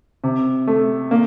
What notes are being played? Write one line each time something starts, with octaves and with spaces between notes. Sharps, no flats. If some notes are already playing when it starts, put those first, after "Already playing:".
C3
A3
A#3